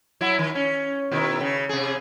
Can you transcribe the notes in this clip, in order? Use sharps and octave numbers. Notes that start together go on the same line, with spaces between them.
F#3 E4
D#3
C#4
B2 D#3 E4
C#3
C3 G#4